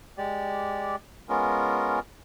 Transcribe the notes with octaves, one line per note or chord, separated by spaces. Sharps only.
G#3 G4 D5
G#3 B3 C#4 F4 A#4